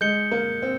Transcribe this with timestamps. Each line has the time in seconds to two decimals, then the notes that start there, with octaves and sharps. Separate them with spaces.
0.01 G#3 G6 C#7 G7
0.31 A#3
0.62 C4